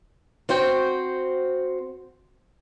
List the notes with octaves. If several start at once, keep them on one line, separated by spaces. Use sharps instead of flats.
C4 F#4 C5 G5